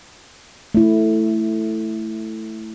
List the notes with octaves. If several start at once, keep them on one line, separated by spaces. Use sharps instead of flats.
A3 E4